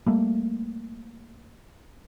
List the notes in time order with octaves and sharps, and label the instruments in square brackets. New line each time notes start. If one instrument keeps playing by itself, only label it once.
[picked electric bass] G3 A3 A#3